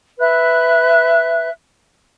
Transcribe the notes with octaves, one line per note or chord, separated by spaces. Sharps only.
B4 E5 F#6